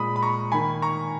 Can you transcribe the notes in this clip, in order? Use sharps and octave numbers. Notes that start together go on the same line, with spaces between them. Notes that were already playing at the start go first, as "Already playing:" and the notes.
Already playing: A#2 G#3 B5 D#6
B5
A#5 C#6
D#3 A#3 G#5 B5
A#5 C#6